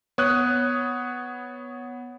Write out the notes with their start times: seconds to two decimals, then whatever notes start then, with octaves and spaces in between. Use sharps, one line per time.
0.18 B3 C#5 D#6 F#6